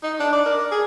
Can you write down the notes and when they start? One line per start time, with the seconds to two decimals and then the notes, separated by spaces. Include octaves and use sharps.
0.03 D#4
0.20 D4
0.32 D5
0.46 A#4
0.71 G#4